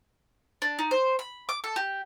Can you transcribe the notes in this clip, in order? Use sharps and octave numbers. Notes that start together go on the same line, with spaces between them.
D4
D#4
C5
B5
D6
A4
G4